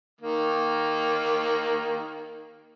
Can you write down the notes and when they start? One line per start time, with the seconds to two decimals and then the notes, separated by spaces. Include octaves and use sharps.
0.21 D#3 A#3